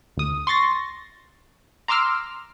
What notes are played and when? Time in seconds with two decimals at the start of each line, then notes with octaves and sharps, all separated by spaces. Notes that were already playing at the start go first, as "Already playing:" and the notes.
0.17 D2 D#6
0.47 C6 C#6 A6 A#6
1.88 A#5 C6 D6 E6 F6